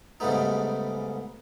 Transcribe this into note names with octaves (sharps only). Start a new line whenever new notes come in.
G#2 C#3 G3 A3 B3 D#4